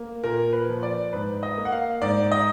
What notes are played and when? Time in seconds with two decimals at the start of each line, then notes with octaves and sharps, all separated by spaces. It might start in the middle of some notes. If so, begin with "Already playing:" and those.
Already playing: A#3
0.24 A#2 A#4
0.53 B4
0.68 F3
0.83 D5
1.13 G#2 B4
1.43 D#5
1.57 A#3
1.65 F#5
1.72 F5
2.02 G#2 D5
2.32 D#5